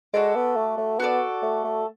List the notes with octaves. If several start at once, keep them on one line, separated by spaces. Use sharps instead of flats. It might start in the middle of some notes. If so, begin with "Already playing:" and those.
G#3 F#4 A4 D5
B3
A3
A3
B3 F#4 A4 D5
A3
A3